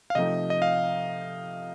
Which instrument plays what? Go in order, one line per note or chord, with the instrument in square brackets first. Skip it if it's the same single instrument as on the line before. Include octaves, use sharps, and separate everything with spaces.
[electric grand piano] F5
[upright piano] C3 F3 A3 D#4 [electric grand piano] D#5
[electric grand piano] D#5
F5